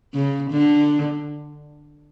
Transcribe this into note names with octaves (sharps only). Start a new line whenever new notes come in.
C#3
D3